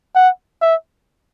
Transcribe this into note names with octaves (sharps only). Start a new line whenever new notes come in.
F#5
E5